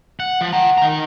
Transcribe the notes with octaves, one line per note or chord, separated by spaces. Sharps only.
F#5
F3
F#5 G5 A#5
D#3 A#5